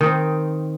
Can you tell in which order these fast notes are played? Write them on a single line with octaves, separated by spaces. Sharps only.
D#3 D#4 C4